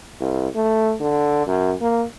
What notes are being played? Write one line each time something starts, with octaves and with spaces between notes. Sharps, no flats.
C2
A3
D3
F#2
A#3